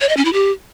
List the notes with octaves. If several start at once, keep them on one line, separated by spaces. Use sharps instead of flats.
C#5
D#5
C#4
E4
G4